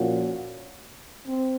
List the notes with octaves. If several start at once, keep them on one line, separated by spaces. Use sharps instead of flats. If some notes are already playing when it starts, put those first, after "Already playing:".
Already playing: A#2 F3 A#3 C#4 F#4
C4